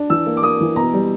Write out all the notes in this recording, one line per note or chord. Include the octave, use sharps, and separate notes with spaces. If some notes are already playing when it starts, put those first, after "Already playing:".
Already playing: D4
E3 E6
A#3
D6
A#3 D#6
E3
B2 A#5
G3